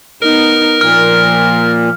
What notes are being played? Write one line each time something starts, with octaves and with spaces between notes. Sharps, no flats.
B3 D#4 A#4
A#2 F3 F6